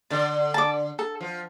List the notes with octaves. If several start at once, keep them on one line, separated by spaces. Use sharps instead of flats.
D3 D5
A5 D6
A4
F3